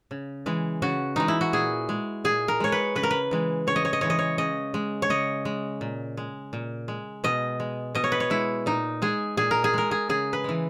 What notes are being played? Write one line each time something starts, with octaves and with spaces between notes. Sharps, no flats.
C#3
E3 G#3
C#3 F#4
E3 G#3 D#4
E4
F#4
A#2 G#4
G#3
A#2 G#4
A#4
G#3 C#5
B4
C#3 B4
A#4
B4
E3 G#3
C#3 C#5
D#5
C#5
D#5
E3 G#3 C#5
D#5
C#5
C#3 D#5
G#3
C#5
C#3 D#5
G#3
A#2
G#3
A#2
G#3
B2 D#5
G#3
B2 D#5
C#5
B4
C#5
G#3 E4
A#2 D#4
G#3 G#4
A#2 G#4
A#4
G#4
G#3 A#4
G#4
C#3 G#4
B4
E3 G#3